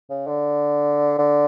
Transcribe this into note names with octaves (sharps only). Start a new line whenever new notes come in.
C#3
D3
D3